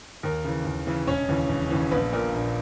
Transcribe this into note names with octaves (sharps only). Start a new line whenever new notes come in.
D#2 A#4
C#3 E3
D#2
C#3 E3
E1 C#4 C#5
D#2 C#3 E3
E1
D#2 C#3 E3
A#1 B3 B4
A#2 A#4
A#1